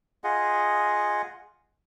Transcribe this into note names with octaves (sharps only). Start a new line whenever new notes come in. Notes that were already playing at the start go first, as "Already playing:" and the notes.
F4 G#4 D#5 F#5